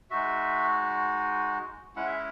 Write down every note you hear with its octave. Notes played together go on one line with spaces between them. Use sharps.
G#3 D#4 F#4 E5
G#3 C#4 E4 F#5
E5